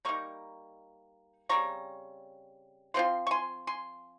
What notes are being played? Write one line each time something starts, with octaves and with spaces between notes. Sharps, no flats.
G3 A#3 D#4 A#5 C#6
C#3 G3 C4 A#5 C#6
C#3 F3 C4 F4 C6
C#6
G#5 C6
G#5 C6